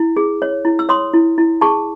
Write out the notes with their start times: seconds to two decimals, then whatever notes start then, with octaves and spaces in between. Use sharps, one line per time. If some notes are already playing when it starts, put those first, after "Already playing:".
Already playing: E4
0.17 G#4
0.42 C#5
0.65 E4
0.79 E6
0.89 C#5 C6 D#6
1.13 E4
1.38 E4
1.61 G#4 A5 C#6